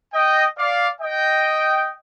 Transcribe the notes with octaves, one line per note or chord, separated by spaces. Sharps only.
D#5 G5
D5 F5
D#5 G5